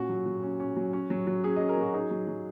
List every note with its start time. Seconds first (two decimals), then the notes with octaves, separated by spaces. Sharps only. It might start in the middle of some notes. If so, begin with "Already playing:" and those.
Already playing: A#2 C#4 F#4
0.09 F#3
0.26 F#3
0.43 C#4
0.60 C#4
0.76 F#3
0.93 C#4
1.10 F#3
1.27 F#3
1.44 C#4 G#4
1.56 C#4 D#5
1.69 A#4
1.77 F#3 F#4
1.94 D#4 G#4
2.11 F#3
2.27 F#3